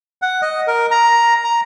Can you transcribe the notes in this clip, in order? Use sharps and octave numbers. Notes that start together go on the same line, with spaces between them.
F#5
D#5
A#4
A#5
A#5